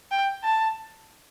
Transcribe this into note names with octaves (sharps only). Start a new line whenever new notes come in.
G5
A5